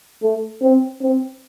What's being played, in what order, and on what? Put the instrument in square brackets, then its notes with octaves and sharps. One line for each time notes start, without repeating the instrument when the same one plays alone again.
[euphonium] A3
C4
C4